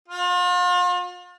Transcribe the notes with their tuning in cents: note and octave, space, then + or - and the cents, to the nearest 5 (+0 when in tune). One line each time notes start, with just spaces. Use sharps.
F4 +40